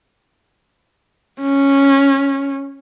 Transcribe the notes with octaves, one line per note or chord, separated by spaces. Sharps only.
C#4